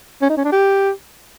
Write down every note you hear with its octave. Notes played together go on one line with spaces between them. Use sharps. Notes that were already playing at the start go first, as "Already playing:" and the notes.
C#4
D#4
C#4
D4
G4